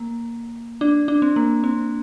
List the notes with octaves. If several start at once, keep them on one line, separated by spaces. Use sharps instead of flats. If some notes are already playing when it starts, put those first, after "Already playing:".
Already playing: A#3
D4
D4
C4
A#3
C4